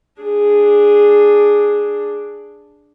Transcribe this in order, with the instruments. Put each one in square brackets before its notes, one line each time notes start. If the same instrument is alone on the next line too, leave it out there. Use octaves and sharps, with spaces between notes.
[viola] D4 G#4